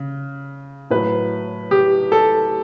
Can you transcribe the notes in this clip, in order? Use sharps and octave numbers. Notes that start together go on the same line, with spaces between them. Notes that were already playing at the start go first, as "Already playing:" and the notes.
Already playing: C#3
A2 F#3 B4
G4
A4